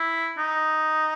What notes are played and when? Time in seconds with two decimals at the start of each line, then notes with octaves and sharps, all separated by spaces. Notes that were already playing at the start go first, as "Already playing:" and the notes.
Already playing: E4
0.38 D#4